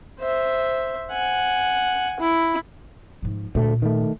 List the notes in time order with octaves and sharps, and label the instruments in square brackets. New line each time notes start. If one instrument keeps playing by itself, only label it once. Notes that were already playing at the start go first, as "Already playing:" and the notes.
[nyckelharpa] C5 E5
F#5 G#5
E4
[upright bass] G#2 F3
[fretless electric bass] D2 A3 [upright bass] A#2
[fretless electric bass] D#3 A3